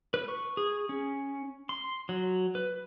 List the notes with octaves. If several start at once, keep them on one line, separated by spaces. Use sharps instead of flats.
B4
C#6
G#4
C#4
C6
F#3
B4